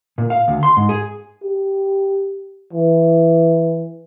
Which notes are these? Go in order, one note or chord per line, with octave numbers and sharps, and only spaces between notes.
A#2
F5
D2
C6
G#2
G#4
G4
E3